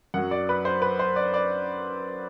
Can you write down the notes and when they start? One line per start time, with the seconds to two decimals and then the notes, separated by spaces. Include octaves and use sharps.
0.14 F#2 F#3 F#5
0.31 D5
0.49 B4
0.65 C5
0.82 B4
0.99 C5
1.16 D5
1.34 D5